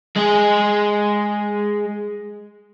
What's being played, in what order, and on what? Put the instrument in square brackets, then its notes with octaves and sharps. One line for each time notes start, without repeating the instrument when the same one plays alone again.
[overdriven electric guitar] G#3 G#4